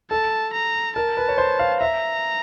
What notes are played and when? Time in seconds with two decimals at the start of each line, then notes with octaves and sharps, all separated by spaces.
0.11 A4 A5
0.53 A#5
0.96 A#4 A5
1.17 B4
1.28 C#5
1.38 C5
1.59 F5
1.81 E5 A#5